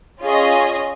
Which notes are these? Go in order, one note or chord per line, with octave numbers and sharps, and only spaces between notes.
C#4 F4 G#4 D#5